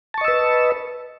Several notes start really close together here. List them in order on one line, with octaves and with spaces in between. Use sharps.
A5 C#6 D#5 E6 B4